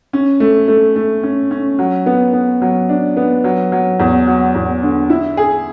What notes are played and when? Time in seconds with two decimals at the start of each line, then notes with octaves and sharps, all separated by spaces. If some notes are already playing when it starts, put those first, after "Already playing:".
0.13 C#4
0.40 A3
0.68 A3
0.96 A3
1.23 C#4
1.51 C#4
1.79 F#3
2.06 B3
2.33 B3
2.62 F#3
2.89 D4
3.17 B3
3.44 F#3
3.72 F#3
4.00 E2
4.27 F#3
4.55 E2
4.83 D3
5.10 E4
5.37 G#4